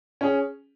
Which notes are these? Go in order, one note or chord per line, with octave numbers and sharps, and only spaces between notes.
C#4 G#4